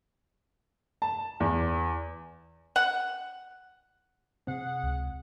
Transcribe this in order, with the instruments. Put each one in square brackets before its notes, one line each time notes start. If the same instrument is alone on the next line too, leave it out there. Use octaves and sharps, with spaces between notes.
[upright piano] A5
E2
[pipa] F#5
[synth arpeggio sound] C3 C4 [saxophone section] G#4 F#5
[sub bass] C#2